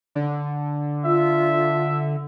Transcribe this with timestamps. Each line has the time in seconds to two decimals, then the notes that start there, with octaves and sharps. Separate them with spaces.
0.15 D3
1.05 F4 E5